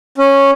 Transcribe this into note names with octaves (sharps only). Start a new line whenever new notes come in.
C#4